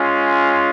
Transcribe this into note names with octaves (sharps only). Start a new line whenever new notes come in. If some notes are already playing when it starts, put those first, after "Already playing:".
Already playing: G#3 C#4 F4